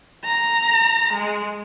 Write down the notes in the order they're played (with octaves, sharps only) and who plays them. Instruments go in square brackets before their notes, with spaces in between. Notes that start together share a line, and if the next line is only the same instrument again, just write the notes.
[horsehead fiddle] A#5
G#3